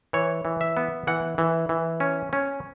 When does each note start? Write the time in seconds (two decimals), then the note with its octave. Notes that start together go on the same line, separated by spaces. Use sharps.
0.13 E3 C#5
0.45 E3
0.61 E5
0.77 B3
1.07 E3 F#5
1.38 E3
1.69 E3
2.00 C#4
2.33 C#4